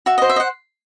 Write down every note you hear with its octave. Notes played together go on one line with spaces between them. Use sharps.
F#4 E5
C5 D#5
E5
D#5
F#5